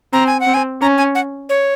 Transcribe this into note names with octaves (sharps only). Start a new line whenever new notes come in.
C4 A#5
G#5
F#5
C4
G#5
C#4 A#5
G#5
F#5
C#5